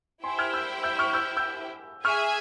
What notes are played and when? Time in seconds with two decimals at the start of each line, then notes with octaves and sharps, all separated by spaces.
0.23 E4 G4 C5 E5 G5 G#5 C6
0.39 F6 G#6
0.53 E6 G6
0.83 E6 G6
0.99 C#6 F6
1.13 E6 G6
1.37 E6 G6
2.04 G#4 E5 G#5 C#6 F6